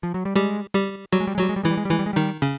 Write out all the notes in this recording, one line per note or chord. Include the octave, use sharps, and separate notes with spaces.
F3
F#3
G3
G3 G#3 G4
G3 G4
F#3 G3 F#4
G#3
G3
G#3
F#3 G3 F#4
G#3
G3
E3 G#3 E4
G3
G#3
G3
E3 G#3 E4
G3
G#3
D#3 G3 D#4
C#3 C#4